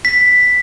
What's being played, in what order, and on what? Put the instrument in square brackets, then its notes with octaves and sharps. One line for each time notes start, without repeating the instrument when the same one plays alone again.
[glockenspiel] B6